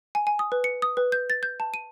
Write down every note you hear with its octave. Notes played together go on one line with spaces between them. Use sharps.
G#5
G#5
D#6
B4
C#7
D#6
B4
G6
A6
G6
A5
D#7